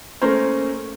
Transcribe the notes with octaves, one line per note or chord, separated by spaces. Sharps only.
A3 A#3 C#4 A#4 C5